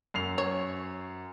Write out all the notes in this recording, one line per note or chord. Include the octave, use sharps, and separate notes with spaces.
F#2 C7 F7
C#5